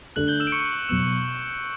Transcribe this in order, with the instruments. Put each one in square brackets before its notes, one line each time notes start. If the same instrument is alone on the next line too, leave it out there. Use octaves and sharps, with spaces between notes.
[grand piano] D3 A3 D4 A4 [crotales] F#6 F#7
[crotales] G6 G7
E6 E7
D7
C#6 C#7
[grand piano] B2 F#3 B3 [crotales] E6 E7